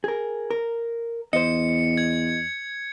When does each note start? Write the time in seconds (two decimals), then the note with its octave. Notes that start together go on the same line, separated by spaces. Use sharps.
0.04 G#4 A#4
0.51 A#4
1.33 E2 C5 D#5 C#7
1.98 G#6